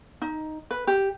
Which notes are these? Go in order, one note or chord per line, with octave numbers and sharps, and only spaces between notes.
D#4
B4
G4